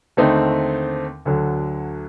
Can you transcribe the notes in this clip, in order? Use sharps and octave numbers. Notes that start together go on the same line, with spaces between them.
D#2 D3 A3 C4 D#4
D2 D3 F#3